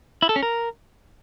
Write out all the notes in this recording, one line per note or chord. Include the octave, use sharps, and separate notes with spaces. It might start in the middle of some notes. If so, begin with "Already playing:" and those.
E4
A4
C#4
A#4